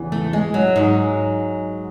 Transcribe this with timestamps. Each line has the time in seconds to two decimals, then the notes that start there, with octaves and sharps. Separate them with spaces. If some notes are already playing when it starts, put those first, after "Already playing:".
Already playing: E2 C#3 E3
0.12 A3
0.33 G#3
0.54 F#3
0.76 G#2 F#3 G#3